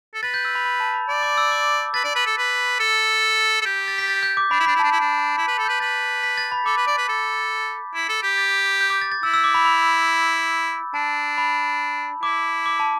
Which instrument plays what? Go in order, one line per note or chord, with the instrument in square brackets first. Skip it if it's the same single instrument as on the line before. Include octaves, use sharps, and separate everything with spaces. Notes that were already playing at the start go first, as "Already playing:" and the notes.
[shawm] A4
[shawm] B4 [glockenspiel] A6
[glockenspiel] G6
E6
B5
B5
A5
B5
[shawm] D5 [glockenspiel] B5
[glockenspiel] D6
E6
D6
[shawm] B4 [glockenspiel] A6
[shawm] D5
B4
A4
B4
A4
[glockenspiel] A6
[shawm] A4
[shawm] G4 [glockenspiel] G6
[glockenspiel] G6
A6
B6
A6
G6
D6
[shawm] D4 [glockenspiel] B5
[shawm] E4
[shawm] D4 [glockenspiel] B5
[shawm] E4
[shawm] D4 [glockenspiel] A5
[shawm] E4
D4
[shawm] E4 [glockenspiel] B5
[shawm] B4 [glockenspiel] B5
[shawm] A4
[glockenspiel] G6
[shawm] B4
[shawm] B4 [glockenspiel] A6
[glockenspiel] B6
A6
B5
[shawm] A4 [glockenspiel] D6
[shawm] B4
D5
B4
A4
E4
A4
G4
[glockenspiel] A6
G6
D6
A6
A6
[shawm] E4 [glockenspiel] E6
[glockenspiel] E6
D6
B5
B5
[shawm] D4 [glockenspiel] A5
[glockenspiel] B5
[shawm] E4 [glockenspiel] D6
[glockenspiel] D6
A5